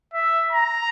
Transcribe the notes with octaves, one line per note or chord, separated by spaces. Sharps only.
E5
A#5